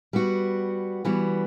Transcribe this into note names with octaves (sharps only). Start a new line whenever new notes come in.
G3 B3 F#4
E3 G3 B3 F#4